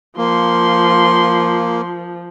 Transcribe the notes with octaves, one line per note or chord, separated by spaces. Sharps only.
F3 A#3 C6